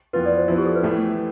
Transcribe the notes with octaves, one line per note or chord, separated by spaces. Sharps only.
F2 E3 B3 F4 B4
D5
C5
F3 B3 E4
G4
A4
B4
A2 E3 A3